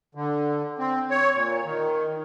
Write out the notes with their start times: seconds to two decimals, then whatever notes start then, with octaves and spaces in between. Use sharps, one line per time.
0.15 D3
0.78 C4
1.10 C#5
1.34 A#2
1.65 D#3